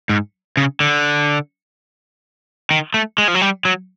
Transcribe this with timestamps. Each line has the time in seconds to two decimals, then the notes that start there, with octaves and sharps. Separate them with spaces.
0.09 G#2
0.57 C#3
0.80 D3
2.71 D#3
2.94 A3
3.18 G#3
3.28 F3
3.35 F#3
3.42 G3
3.65 F#3